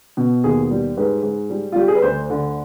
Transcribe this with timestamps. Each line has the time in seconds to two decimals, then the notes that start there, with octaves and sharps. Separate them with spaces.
0.17 B2
0.44 D#2 G#4
0.71 G3
0.97 G#2 B4
1.23 G#2
1.50 G3
1.72 F4
1.76 G3 G4
1.88 G#4
1.95 B4
2.02 D2 C5
2.30 D3